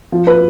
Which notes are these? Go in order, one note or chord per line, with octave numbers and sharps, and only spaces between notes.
F3
B4